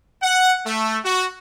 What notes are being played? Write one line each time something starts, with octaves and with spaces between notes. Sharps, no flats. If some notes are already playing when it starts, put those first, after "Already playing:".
F#5
A3
F#4